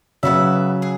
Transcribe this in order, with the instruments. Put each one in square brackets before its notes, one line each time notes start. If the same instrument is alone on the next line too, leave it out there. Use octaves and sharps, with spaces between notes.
[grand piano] C#3 F#3 [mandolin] B3 F#4 B4 E5
[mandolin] G#4